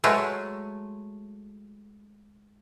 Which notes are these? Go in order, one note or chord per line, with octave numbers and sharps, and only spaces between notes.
F#3 G#3 A3